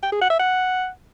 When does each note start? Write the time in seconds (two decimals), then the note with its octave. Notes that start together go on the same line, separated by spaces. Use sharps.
0.03 G5
0.12 G#4
0.21 F#5
0.30 E5
0.39 F#5